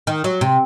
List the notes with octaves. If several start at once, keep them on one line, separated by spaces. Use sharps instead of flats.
D#3
F#3
C3